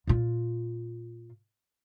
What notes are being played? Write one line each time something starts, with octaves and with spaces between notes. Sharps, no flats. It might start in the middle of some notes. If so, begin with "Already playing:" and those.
A#2 F4